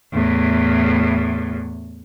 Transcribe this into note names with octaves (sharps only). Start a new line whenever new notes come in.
E2 A2